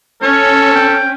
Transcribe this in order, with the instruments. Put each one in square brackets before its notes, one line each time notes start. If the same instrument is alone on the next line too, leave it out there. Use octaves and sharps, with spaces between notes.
[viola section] C#4 [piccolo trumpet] A4 [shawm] C#5
[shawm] G5